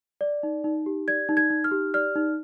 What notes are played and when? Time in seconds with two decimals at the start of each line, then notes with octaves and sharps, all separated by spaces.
0.21 D5
0.43 D#4
0.64 D#4
0.86 G4
1.08 D5 G#6
1.29 D#4
1.37 G#6
1.50 D#4
1.64 F6
1.72 G4
1.94 D5 F6
2.16 D#4